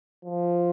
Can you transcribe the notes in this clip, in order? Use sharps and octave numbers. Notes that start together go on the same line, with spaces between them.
F3